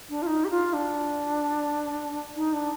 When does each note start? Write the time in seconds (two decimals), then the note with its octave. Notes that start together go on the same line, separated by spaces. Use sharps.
0.10 D4
0.22 F4
0.27 D#4
0.44 G4
0.50 F4
0.73 D4
2.36 D#4
2.53 D4